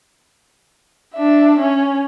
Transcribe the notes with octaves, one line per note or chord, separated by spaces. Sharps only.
D4 E5
C#4